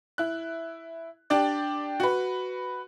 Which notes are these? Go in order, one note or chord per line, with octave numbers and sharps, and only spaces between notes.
E4 F#6
D4 G4 D5
F#4 B4